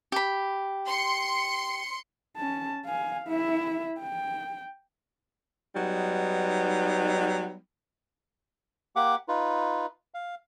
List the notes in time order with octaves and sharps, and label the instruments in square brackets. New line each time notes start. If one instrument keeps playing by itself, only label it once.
[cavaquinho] G4 B5
[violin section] C6 C#7
[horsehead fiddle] C#4 A5
F5 G#5
E4 E5
G5
[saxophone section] F#3 G3 B3 D#4
[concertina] A#3 G4 F#5 D6
D#4 F4 B4
F5